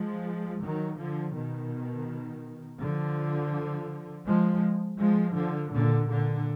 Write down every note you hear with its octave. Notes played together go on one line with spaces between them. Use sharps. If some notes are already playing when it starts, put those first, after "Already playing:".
Already playing: F3 G#3
D#3 F#3
D3 F3
B2 D#3
D3 F3
F3 G#3
F3 G#3
D3 F3
A#2 D3
A#2 D3